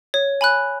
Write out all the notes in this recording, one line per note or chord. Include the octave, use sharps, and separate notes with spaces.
C#5
G#5 B5 F#6